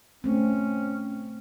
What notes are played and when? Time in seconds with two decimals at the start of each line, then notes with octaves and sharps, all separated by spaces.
0.24 A3 C4 C#4